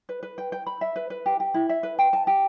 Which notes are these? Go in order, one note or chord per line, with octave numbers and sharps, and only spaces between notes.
B4
B4
G5
G5
B5
E5
B4
B4
G4
G4
E4
E5
B4
G5
A5
G4